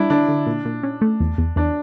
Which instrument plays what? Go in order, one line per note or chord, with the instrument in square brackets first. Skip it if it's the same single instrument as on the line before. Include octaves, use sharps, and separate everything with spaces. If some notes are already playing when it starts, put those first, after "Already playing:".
Already playing: [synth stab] G3 [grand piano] D4 E4
[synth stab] D3 [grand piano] D4
[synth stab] D3
A#2
A#2
C#4
A3
E2
E2
[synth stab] E2 [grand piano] D4